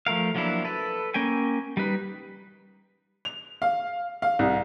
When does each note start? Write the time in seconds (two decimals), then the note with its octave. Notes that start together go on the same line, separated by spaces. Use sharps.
0.07 F3 A3 A#4 F5
0.35 F3 F#3 A#3 D4 E4
0.65 A4 B4
1.14 A#3 C#4 G5 G#5
1.77 G3 D#4 B4
3.25 F7
3.62 F5
4.22 F5
4.39 C2